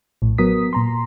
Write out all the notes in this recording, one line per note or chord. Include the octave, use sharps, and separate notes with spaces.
A#1 A2
F#3 B3 A#4 D#6 B6
A#2 A#5 C6